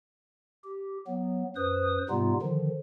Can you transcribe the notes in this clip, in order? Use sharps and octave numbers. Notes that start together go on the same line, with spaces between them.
G4
F#3 B3
F#2 B4 C5 D#6
G#2 C3 G3 B3 D#4 F4
D3 D#3 F3